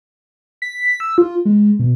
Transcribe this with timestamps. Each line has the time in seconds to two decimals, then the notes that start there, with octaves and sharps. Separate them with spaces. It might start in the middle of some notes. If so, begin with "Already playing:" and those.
0.62 B6
1.00 E6
1.18 F4
1.45 G#3
1.79 B2